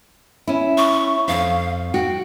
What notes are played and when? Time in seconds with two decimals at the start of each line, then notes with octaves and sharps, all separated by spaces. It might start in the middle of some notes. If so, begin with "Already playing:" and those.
0.47 C#4 E4
0.77 C#6
1.28 F2 F5
1.94 F#4 G5